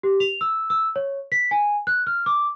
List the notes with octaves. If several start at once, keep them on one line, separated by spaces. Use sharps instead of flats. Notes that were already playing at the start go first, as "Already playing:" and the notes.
G4
F7
E6
E6
C#5
B6
G#5
F#6
F6
D6